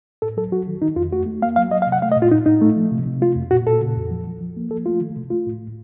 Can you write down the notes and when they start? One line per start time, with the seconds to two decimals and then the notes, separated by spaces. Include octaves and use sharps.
0.22 A2 A4
0.37 F#3 A4
0.52 F#3 F#4
0.68 D#3
0.82 D#3 D#4
0.96 F2 F4
1.13 A3 F#4
1.26 A3
1.42 A#3 F5
1.56 F#3 F5
1.71 F#3 D#5
1.82 F5
1.87 C3
1.92 F#5
2.02 A3 F5
2.12 D#5
2.17 A#2
2.22 F4
2.32 A2 D#4
2.46 A2 D#4
2.62 A3
2.76 F3
2.91 C3
3.06 C3
3.21 A3 F4
3.36 F2
3.51 A#2 F#4
3.67 A#2 A4
3.81 C#3
3.97 F2
4.11 F3
4.27 F3
4.41 F3
4.57 A#3
4.71 F3 A4
4.86 A3 F4
5.01 D#3
5.17 C3
5.30 A3 F4
5.47 A2